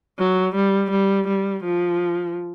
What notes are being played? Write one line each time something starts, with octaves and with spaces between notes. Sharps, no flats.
F#3
G3
G3
G3
F3